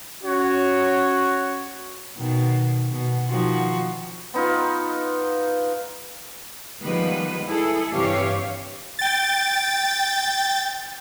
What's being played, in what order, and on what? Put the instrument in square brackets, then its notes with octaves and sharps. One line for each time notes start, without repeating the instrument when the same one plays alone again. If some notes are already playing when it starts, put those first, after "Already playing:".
[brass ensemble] C#4 F#4 C#5
[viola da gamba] B2 D#3
B2
D#3 F3 F#4
[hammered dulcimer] B3 D#4 F4
[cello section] D#3 F3 G3 G#3 B3 B4
E4 G#4 A4
G2 C3 E3 G4 C#5 F5
[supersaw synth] G5 A6